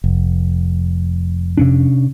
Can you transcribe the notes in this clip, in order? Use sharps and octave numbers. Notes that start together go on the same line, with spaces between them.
F1
C3 C#4 D4